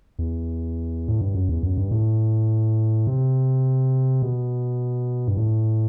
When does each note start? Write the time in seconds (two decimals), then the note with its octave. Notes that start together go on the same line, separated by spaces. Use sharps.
0.19 E2
1.08 A2
1.21 G2
1.34 F#2
1.49 E2
1.63 F#2
1.78 G2
1.91 A2
3.07 C3
4.22 B2
5.28 G2
5.37 A2